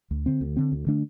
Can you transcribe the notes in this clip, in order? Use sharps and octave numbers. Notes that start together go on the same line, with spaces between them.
D2
D3 C4
D2
D3 C4
D2
D3 A3 D4